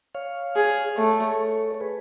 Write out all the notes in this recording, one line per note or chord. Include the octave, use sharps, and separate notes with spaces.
C#5 F5
G#4
A3 A4 C#5
C#5
G#4 B4